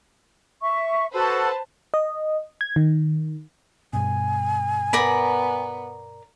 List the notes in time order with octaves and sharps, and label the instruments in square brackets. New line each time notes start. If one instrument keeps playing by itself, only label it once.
[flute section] E5 C#6
[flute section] F#4 A4 [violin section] B4 C5 A5
[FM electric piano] D#5
G#6
D#3
[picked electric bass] G2 B2 [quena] G#5
[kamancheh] B3 [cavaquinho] A#4 D5 B5